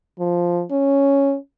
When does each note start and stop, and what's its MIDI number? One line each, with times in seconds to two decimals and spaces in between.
0.20 0.62 53
0.71 1.36 61